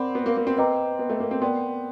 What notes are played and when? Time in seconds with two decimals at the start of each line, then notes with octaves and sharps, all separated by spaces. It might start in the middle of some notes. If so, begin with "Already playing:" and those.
Already playing: C4 A#4 D5 F#5 B5 D6
0.15 B3
0.26 A#3
0.37 A#3
0.47 C4
0.57 C4 B4 D#5 G5 A#5 D6
0.99 B3
1.09 A3
1.20 A#3
1.31 C4
1.42 B3 A#4 D5 G5 C6